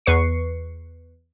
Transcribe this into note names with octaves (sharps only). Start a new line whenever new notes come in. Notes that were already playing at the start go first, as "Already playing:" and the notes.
E2 B4 C#6 C7 C#7